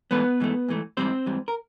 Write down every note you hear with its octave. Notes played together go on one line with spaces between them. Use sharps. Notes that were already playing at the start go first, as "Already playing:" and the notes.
G#2 E3 A3 B3 B4
G#2 E3 A3
G#2 E3 A3
G#2 E3 G3 C4 C5
G#2 E3 G3
A#4